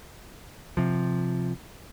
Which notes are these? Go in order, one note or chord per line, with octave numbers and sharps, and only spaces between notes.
C3 F3